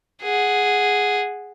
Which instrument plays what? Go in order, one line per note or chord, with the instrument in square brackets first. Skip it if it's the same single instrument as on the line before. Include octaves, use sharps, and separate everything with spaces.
[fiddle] G#4 F#5